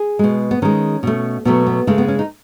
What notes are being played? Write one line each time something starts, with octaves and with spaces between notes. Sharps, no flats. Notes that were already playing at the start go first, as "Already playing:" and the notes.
Already playing: G#4
B2 G#3
B3
D#3 G#3 C#4
B2 A3
B2 F#3 A3 B3
B3
C#3 G#3 A3
B3
C#4
D#4